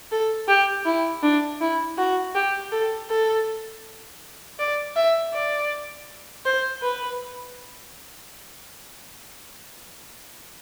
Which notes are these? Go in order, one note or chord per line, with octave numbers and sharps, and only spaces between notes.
A4
G4
E4
D4
E4
F#4
G4
A4
A4
D5
E5
D5
C5
B4